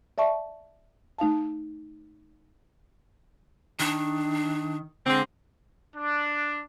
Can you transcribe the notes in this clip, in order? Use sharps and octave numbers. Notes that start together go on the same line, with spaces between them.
D5 E5 A5 C#6
A3 D#4 F5 A5
D#3 D4
D3 G#3 C4
D4